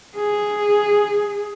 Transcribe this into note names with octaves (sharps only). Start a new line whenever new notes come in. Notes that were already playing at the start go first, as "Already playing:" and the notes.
G#4